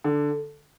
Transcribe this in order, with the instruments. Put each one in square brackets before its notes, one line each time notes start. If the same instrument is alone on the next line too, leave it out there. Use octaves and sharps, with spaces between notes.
[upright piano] D3 [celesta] A4